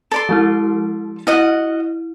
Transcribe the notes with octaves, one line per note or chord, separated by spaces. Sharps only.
A4 D5 C6
F3 G#3 E4
E4 F#4 D#5 F#5